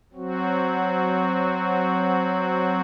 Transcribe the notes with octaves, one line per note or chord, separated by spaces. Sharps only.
F#3 C4 F#4